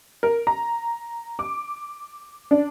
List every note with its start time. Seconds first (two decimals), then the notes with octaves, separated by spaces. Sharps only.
0.23 A#4
0.47 A#5
1.39 D6
2.51 D4